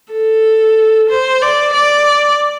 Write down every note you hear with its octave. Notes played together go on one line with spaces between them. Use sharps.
A4
C5
D5
D5